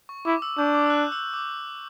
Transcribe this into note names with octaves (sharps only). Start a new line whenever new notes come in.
C#6
E4 D6
E6
D4 G6
D6
E6
F#6
E6
D6